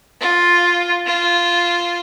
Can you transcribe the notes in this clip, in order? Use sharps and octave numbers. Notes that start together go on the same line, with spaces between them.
F4
F4